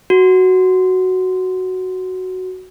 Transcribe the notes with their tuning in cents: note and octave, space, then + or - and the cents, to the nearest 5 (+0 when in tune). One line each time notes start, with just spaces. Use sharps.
F#4 +5